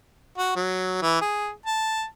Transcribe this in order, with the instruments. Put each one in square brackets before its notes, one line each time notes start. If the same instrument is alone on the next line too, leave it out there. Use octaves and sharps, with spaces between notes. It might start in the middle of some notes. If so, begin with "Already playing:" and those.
[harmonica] F#4
F#3
E3
G#4
A5